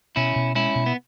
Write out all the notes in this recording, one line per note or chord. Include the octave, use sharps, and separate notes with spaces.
B2 C#4 E4
B2
G#3 C#4 E4
B2
B3